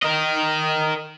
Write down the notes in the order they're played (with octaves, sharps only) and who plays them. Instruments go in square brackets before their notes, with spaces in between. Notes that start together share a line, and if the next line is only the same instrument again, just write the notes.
[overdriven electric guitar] A#4 D#5